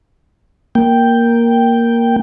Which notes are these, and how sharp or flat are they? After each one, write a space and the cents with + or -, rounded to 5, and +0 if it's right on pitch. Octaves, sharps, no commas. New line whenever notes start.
A#3 +0 G5 +0